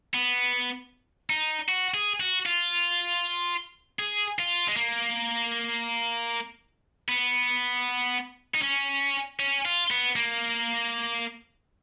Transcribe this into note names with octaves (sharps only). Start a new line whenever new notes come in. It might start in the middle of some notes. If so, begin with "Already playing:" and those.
B3
D#4
F#4
G#4
F#4
F4
G#4
F4
G#3
A#3
B3
D#4
C#4
C#4
F4
B3
A#3